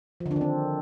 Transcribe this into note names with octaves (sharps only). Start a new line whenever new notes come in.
F3
D3
D4
D#3
C4